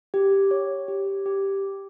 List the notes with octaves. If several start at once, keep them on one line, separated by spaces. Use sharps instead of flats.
G4
C#5
G4
G4